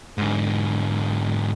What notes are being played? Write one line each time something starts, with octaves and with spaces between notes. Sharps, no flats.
G#2 D3